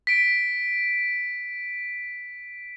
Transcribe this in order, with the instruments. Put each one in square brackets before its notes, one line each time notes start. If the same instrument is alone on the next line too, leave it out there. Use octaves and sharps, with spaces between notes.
[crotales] B6 D7